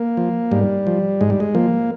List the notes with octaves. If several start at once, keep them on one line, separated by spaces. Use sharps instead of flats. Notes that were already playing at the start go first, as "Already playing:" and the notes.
Already playing: A#3
F3
G#2 G3
F3
G#2 G#3
G3
G#3
F3 A#3